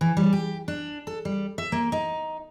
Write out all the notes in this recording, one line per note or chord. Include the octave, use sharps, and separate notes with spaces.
E3
G3
G4
D4
A4
G3
E5
A#3
D#4